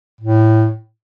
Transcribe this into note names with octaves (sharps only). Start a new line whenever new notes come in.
A2